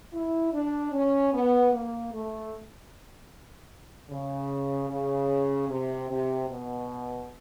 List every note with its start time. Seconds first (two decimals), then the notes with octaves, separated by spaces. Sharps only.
0.13 E4
0.52 D4
0.92 C#4
1.33 B3
1.72 A#3
2.12 A3
4.10 C#3
4.90 C#3
5.69 C3
6.10 C3
6.48 B2